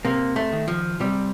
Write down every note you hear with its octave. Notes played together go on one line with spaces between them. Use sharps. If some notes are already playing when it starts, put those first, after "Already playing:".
C3 A#3
A3
D#3
F3
C3 G3